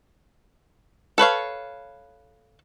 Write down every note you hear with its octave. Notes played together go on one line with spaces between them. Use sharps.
A4 B4 C#5 F5